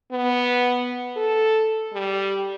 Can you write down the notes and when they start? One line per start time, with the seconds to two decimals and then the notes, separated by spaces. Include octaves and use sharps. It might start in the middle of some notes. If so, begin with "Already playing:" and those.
0.12 B3
1.17 A4
1.93 G3